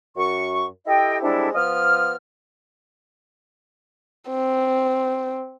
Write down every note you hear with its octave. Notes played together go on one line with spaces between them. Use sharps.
F#2 C#6
E4 G4 A4 D#5 G5
G3 G#3 C4 D4 E4 A4
F3 B3 D#6 F6
C4